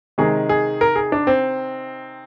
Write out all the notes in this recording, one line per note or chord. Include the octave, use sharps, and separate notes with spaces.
C3 D#3 G#3 G#4
G#4
A#4
G#4
D4
C4